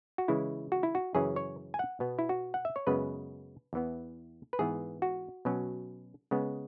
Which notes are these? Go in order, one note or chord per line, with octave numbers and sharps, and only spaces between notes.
F#4
C#3 E3 G#3 E4
F#4
E4
F#4
F#2 C#3 E3 C#4 G#4
C#5
G#5
F#5
B2 B3
E4
F#4
F#5
E5
C#5
F#2 C#3 G#3 B3 B4
E2 E3 B3
B4
G#2 E3 B3 G#4
F#4
B2 F#3 C#4
C#3 G#3 B3